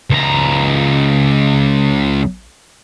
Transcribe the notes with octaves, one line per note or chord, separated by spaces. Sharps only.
C#2 A#5